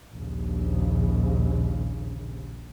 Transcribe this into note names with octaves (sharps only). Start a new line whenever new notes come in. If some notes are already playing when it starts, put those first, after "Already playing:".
A#1 D#2 C#3